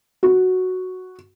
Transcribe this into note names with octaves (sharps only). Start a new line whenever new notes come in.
F#4